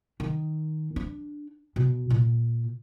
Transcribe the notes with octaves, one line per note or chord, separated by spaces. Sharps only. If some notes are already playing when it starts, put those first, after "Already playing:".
D#3
D4
B2
A#2